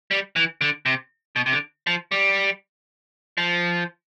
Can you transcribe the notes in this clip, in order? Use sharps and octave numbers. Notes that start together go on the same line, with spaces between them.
G3
E3
D3
C3
B2
C3
D3
F3
G3
F3